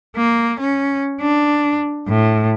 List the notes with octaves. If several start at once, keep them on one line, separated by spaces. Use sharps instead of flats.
A#3
C#4
D4
A2